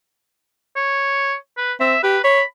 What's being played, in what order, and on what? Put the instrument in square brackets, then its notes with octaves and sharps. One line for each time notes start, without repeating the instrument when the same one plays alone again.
[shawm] C#5
B4
[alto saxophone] C4 [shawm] E5
[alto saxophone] G4 [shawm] B4
[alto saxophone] C#5 [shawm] B5